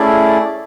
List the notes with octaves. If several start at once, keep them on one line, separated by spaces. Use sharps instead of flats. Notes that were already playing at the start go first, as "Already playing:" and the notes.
Already playing: A3 C#4 E4 G#4 D5